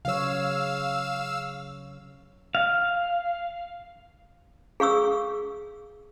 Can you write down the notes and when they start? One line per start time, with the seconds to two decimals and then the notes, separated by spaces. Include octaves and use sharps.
0.05 C#3 F#3 C#5 F5 E6
2.55 F5
4.80 G#4 F5 C#6 E6